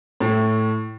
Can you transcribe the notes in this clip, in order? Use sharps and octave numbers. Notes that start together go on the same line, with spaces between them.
A2